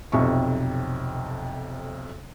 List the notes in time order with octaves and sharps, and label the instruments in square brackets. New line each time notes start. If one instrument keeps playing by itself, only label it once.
[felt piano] B1 F2 C3 E5 C#6